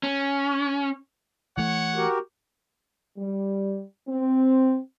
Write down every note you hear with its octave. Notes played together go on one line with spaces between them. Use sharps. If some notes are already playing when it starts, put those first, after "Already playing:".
C#4
E3 A3 C#5 F#5
F#4 G4 A#4
G3
C4